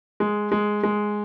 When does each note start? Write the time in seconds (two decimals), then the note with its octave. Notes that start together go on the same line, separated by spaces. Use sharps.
0.20 G#3
0.52 G#3
0.83 G#3